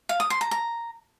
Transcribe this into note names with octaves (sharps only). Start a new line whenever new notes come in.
F5
D#6
C6
A#5
A#5